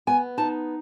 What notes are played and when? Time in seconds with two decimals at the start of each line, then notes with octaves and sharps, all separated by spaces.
0.07 B3 G#5
0.38 D#4 A5